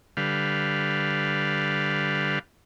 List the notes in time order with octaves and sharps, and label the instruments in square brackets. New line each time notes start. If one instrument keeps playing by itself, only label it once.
[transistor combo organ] D3 G3 B4 F5